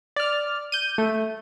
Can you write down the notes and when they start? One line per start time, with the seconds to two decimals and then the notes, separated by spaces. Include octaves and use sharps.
0.16 D5 F6
0.72 G6 D#7
0.98 A3